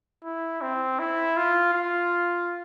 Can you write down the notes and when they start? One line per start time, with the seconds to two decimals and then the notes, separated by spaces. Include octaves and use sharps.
0.24 E4
0.62 C4
0.99 E4
1.37 F4
1.74 F4